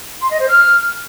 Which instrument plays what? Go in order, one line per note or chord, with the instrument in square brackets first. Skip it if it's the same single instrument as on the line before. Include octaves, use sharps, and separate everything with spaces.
[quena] C6
D#5
C5
F6